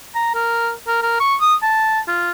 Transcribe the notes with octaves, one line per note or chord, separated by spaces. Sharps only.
A#5
A#4
A#4
A#4
C#6
D#6
A5
F4